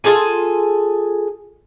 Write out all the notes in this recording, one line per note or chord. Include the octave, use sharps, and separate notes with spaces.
F4 G#4 A4 G#5